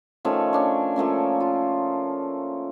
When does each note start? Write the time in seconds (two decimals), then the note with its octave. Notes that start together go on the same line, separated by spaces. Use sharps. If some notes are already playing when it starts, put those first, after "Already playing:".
0.25 D#3 F3 A3 C#4
0.53 C#4 D4 C#5
0.96 F3 A3 A#3 C#4
1.40 F4